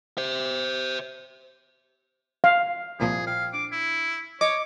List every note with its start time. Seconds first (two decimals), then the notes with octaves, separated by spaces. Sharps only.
0.17 C5 E5
2.44 F5
3.00 C2 A#2 F3 G#4
3.27 F5 G5
3.53 D4 D6
3.72 E4
4.41 C#5 D#5 D6